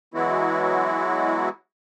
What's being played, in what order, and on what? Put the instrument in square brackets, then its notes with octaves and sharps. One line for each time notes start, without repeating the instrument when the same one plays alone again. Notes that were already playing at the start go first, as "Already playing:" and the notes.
[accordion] E3 F#3 G#3 B3 E4 F#4